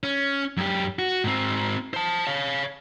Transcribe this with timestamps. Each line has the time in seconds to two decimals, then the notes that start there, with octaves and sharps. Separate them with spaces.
0.03 C#4
0.57 F#2 G4
0.99 F#4
1.24 G#2 C4
1.94 C5 A5
2.27 C#5 F5